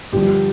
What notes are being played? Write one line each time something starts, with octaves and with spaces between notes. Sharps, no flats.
G2 D3 F3 G4